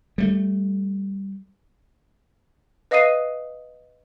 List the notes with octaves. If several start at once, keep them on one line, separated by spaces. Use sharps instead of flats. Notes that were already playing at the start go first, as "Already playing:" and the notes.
G3 A3
B4 D#5 F5 D#6 C7 D#7